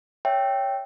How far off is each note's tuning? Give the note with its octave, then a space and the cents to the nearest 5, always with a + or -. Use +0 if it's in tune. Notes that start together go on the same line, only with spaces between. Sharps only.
C#5 +0 E5 +0 G5 +0